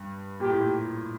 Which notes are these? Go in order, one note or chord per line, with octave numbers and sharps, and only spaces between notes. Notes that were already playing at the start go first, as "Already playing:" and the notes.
Already playing: G2
A#2 G4
A2
A#2